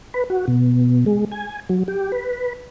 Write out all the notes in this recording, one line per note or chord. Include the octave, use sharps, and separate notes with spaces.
B4
F#4
B2
G#3
G#5
F#3
G4
B4